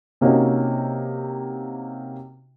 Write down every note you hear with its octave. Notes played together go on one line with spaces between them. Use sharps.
C3 A#3 C#4 D#4 F#4